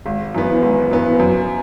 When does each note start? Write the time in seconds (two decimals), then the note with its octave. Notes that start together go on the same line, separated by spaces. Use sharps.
0.06 G#1
0.35 F#2 E3 B3
0.62 G#1
0.91 F#2 E3 B3
1.20 F#2